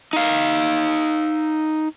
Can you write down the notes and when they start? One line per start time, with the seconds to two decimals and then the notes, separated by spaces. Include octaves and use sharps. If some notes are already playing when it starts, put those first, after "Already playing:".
0.13 D#4 F5